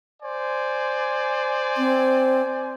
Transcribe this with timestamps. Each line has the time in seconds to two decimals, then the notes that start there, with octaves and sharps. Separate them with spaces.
0.22 C5 D5 G#5
1.77 C4